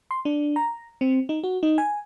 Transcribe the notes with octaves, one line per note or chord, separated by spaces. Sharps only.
C6
D4
A#5
C4
D#4
F#4
D#4
G#5